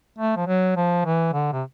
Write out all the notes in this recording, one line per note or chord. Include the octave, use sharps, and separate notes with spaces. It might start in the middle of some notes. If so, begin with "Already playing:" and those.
A3
F3
F#3
F3
E3
D3
C3